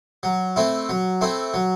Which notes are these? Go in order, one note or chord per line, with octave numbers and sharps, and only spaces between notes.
F#3
A3 C4 E4
F#3
A3 C4 E4
F#3